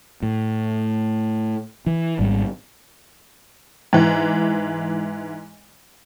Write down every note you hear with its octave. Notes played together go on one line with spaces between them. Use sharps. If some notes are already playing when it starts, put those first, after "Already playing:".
A2
E3
G#1 G#2 G3
G#2 E3